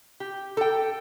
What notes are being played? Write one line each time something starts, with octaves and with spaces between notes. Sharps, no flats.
G4
A4 G5